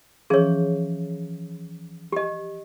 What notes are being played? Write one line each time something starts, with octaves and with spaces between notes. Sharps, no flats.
E3 F3 C#4 G#4 C#5
G4 D#5